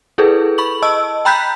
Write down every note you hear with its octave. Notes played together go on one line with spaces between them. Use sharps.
E4 G#4 A4 B4
B5 C#6 F#7
D#5 A5 E6
G5 A#5 B5 F#6 G6 B6